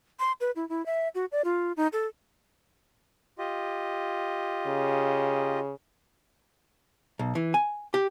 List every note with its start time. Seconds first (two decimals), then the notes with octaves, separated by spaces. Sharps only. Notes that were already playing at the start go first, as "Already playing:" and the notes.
0.19 C6
0.41 B4
0.56 E4
0.69 E4
0.86 E5
1.15 F#4
1.32 D5
1.44 F4
1.77 D#4
1.93 A4
3.38 F4 G4 D#5
4.67 C#3
7.19 B1
7.35 E3
7.54 G#5
7.94 G4